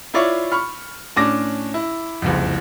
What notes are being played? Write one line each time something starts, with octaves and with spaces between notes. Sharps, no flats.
E4 F4 C#5 D5 E5
B5 C#6 F6
A2 C#4 D4 D6 A#6
E4
F#1 C2 F2